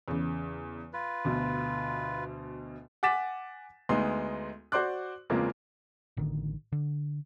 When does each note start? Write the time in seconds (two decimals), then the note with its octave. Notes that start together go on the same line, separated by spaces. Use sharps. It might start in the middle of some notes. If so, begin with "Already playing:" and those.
0.08 E2 C#3
0.93 F4 B4
1.25 D2 B2
3.03 F#5 G#5 D6 A6 B6 E7
3.89 D2 G#3 A3 B3 D#4 C6
4.72 F#4 C5 D5 C6 D6 F#6
5.30 E2 C#3 F3 G#3 A#3 C4
6.17 A1 D3 D#3
6.72 D3